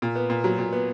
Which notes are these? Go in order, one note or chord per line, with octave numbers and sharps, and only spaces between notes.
A#2
B3
A#2
F#3
A#2
B3